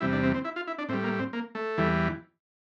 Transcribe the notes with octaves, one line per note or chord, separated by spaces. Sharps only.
E2 C3 G3 E4
D4
C4
C4
E4
F4
E4
D4
A2 G3 C4
A#3
C4
A#3
A3
E2 E3 G3